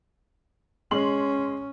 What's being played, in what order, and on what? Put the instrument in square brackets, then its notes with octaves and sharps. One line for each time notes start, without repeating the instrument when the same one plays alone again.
[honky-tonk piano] G#3 C6 F#7 [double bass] C#4